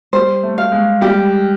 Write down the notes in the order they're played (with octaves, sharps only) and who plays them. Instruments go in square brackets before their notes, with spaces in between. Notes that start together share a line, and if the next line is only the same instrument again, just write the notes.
[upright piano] G3 [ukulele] C5
[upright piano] A3
[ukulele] F5
[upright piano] G#3
[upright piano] G3 [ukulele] G4